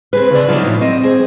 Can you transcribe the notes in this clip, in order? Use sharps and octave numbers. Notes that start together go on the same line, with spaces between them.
C4 G#4 B4
C#3 D5
F#3 D4 D#4 F4 F#4
A2 F3
C4 D#5
G#4 C5